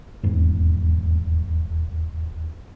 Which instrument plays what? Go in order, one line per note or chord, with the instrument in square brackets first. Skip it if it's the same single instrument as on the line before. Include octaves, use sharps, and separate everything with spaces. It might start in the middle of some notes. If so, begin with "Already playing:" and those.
[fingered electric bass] D#1 E2 G#2